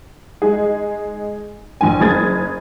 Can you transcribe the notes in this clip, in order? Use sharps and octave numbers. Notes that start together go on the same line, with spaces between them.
G#3 D#4 G#4
A#1 G2 G#5
F#1 G#4 D#6 G#6 A6